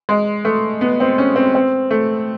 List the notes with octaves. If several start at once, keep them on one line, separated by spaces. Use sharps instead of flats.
G#3
A3
B3
C4
C#4
C4
C4
A3